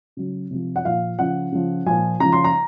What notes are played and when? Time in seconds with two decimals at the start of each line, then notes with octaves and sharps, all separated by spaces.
0.17 C#3 F#3
0.51 C3 F3
0.76 F#5
0.85 A#2 F3 F5
1.19 C#3 F3 F#5
1.52 C#3 F3
1.86 A#2 F3 G#5
2.20 C#3 F3 A#5
2.32 C6
2.44 A#5